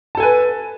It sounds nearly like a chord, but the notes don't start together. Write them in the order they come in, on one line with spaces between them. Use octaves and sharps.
A5 A4 G#5 B4